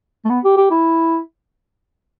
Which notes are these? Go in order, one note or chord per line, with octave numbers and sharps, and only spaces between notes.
A3
B3
G4
G4
E4